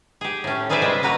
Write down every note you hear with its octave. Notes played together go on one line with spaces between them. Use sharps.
G4 G#4
A2 C#4
F4 G#4 B4 C5 D5 E5
C#3 G3 G#3
A#3 F#4 B4 A#5